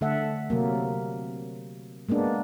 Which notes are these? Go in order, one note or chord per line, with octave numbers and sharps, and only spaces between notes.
D3 A3 A4 E5 F#5
C3 F#3 A#3
G#3 A#3 B3 D4